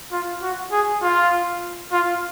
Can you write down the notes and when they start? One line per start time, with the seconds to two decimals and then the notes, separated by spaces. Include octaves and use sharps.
0.12 F4
0.42 F#4
0.72 G#4
1.03 F4
1.92 F4